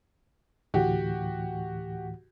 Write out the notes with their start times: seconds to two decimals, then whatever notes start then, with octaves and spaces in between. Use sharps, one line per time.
0.74 D2 A2 E3 F#4 G4